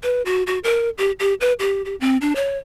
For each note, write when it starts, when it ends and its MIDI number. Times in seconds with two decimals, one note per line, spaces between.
0.03 0.22 71
0.25 0.43 66
0.47 0.59 66
0.64 0.90 70
0.98 1.12 67
1.20 1.34 67
1.41 1.53 71
1.59 1.82 67
1.85 1.95 67
2.00 2.17 60
2.21 2.35 62
2.35 2.57 73